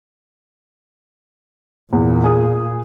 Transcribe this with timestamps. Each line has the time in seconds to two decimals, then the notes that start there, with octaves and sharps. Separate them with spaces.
1.93 E2 A#2
2.24 G#4 D#6